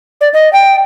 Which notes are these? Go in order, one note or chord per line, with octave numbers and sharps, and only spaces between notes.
D5
D#5
G5